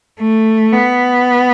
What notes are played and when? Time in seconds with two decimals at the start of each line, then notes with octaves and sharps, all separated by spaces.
0.20 A3
0.72 B3